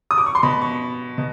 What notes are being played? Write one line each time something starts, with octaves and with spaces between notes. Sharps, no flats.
D#6
D6
C#6
C6
B2 B5
C#6
B2